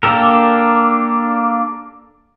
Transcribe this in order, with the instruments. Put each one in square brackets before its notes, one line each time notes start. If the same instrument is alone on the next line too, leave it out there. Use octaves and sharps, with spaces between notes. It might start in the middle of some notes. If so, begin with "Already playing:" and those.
[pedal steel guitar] A#3 D4 G4 A4 A#4